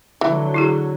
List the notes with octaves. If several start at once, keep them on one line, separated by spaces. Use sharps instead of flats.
D3 E3 F#3
E4 F#4 G#4